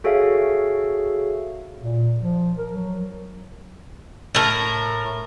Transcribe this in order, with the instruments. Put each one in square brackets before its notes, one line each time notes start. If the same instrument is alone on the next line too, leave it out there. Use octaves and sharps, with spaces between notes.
[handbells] F#4 G#4 A4 C#5 E5 F5
[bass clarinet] A#2
F3
A#4
F#3
[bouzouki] A2 A#4